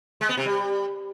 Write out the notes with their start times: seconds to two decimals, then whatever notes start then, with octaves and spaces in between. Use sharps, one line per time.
0.21 G#3
0.29 B3
0.37 C3
0.46 G3